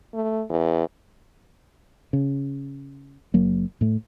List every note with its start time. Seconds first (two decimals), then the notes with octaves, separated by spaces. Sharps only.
0.14 A3
0.50 E2
2.13 C#3
3.34 F#1 F#3 A#3
3.81 A2 A3